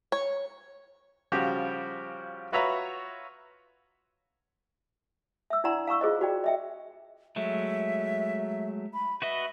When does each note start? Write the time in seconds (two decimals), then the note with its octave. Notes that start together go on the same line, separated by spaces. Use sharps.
0.12 C#5
1.32 C#3 F3 G3 F#4 G4
2.52 F4 F#4 B4 C#5 E5 A#5
5.50 E5 E6
5.64 D4 E4 D5 F#5 A#5 C6
5.87 F5 A#5 C#6 E6
6.01 F4 G#4 C5 D#5
6.21 F#4 D5 G5
6.44 D#5 E5 G5
7.36 F#3 G#3 A3 E5
8.94 B5
9.22 F#4 B4 D#5 E5